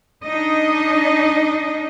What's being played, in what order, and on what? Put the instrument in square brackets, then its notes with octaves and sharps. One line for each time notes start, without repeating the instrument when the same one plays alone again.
[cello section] D4 D#4 D#5